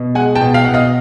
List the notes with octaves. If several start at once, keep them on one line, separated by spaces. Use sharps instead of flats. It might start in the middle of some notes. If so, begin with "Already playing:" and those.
Already playing: B2
G#3 F#5 G#5
G5 A5
B2
F5 G5
B2 F#5
D#5 F5